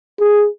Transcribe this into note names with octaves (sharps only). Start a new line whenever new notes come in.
G#4